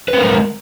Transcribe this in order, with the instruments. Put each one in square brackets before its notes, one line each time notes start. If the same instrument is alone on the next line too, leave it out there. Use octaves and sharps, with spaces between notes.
[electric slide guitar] B4
C4
A#4
G#3